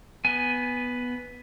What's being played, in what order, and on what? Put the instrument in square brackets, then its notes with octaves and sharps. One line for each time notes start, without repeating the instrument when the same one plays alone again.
[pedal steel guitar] B3 G#5